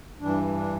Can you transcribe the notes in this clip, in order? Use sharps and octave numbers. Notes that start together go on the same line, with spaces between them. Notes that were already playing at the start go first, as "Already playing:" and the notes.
G2 E3 D4
D4